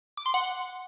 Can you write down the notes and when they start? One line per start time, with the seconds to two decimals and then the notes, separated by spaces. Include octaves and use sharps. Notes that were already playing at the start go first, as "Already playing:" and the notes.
0.17 D6
0.26 C6
0.34 F#5